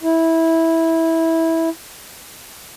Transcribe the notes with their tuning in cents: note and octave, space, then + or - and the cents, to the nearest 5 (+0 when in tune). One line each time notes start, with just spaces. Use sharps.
E4 -15